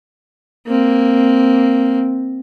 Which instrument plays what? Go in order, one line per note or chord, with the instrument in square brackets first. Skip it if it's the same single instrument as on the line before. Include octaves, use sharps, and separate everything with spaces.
[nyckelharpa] A#3 C4